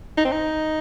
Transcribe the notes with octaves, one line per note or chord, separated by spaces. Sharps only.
D#4
C4
D#4